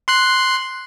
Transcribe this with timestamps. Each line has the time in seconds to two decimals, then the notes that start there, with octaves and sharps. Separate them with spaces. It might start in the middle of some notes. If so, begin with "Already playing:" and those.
0.08 C6 F#6 C7